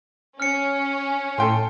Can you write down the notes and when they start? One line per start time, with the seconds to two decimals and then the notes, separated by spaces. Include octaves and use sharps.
0.40 C#4 F6 C#7
1.38 A2 A4 G5 C6